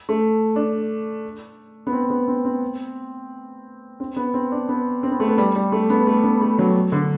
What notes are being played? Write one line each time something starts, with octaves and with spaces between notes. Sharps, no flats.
A3
D4
B3
C4
B3
C4
C4
C4
B3
C4
D4
B3
C4
B3
A3
B3
G3
G3
A3
B3
A3
B3
A3
F#3
D3